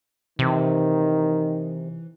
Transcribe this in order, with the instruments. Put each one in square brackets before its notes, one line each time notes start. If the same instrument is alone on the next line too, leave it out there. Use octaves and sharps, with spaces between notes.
[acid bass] C3 [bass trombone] D#3 [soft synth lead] E3